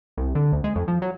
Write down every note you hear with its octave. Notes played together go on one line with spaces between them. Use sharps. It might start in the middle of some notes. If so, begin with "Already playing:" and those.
C2
D3
D2
G#3
F2
F3
F#3